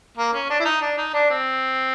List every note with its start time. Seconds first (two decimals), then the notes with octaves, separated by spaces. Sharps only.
0.17 A#3
0.33 C#4
0.50 D4
0.60 E4
0.65 D#4
0.81 D4
0.97 D#4
1.14 D4
1.31 C4